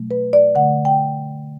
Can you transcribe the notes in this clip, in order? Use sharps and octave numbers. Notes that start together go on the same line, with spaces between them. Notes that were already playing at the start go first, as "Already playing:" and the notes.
Already playing: B2 F#3 A3
B4
D5
D3 A3 F#5
G5